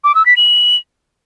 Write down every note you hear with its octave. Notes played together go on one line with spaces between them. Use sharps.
D6
E6
B6
F#7